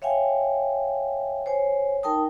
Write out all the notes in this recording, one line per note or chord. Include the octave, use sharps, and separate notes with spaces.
C#5 E5 F5 G5 G#5
C5 C#5 G#5
D#4 A#4 G5 A5 D#6